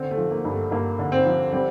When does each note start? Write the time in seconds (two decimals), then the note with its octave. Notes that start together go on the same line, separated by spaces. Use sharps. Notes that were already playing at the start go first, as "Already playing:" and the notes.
Already playing: D3 C4
0.11 A3
0.18 F3
0.31 A#3
0.45 G2
0.52 A3
0.71 G2 A#3
0.99 D3
1.12 C4
1.26 F3
1.53 G3 C4